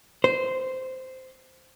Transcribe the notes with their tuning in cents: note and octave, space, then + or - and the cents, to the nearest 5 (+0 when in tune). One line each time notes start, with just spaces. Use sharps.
C5 -10